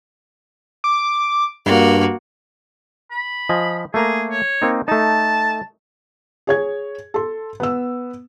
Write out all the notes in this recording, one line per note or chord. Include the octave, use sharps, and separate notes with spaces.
D6
G2 A#3 F#4
B5
F3 D#5 G#5
A3 A#3 G#4 A#5
C#5
A#3 C4 D#4
A3 D#4 A5
G#4 C#5 G#6
A4 C6
B3 E6